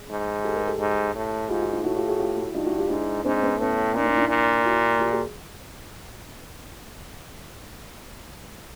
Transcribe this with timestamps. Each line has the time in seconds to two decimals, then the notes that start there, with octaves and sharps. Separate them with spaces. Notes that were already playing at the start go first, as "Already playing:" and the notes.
Already playing: G#4
0.10 G#2
0.44 G4 A4
0.56 G#4 A#4
0.67 G4 A4
0.79 G#2
1.15 A2
1.49 G#2 F4 G4
1.61 F#4
1.72 D#4 F4
1.84 A2 E4 F#4
1.96 F4 G4
2.08 F#4 G#4
2.19 F4 G4
2.37 E4 F#4
2.54 G2 D#4 F4
2.66 E4 F#4
2.78 F4 G4
2.89 G#2 D4 E4
3.24 G#2 C4 D4
3.42 B3 C#4
3.59 A2 B3 C#4
3.94 A#2 C#4 D#4
4.06 C#4 D#4
4.17 D4 E4
4.29 A#2
4.65 E4 F#4
4.99 F4 G4
5.11 F#4 G#4